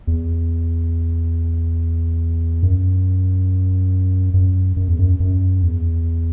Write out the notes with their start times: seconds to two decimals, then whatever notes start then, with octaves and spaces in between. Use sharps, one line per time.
0.07 E2
2.63 F#2
4.34 F#2
4.77 F#2
4.88 E2
4.99 F#2
5.20 F#2
5.63 E2